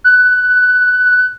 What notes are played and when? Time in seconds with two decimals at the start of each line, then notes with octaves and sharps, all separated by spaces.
0.04 F#6